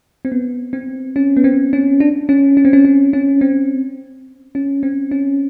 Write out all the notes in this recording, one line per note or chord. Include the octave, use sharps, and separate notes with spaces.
C4
B3
C4
C#4
B3
C4
C#4
D4
C#4
C#4
C4
C#4
C#4
C#4
C4
C#4
C4
C#4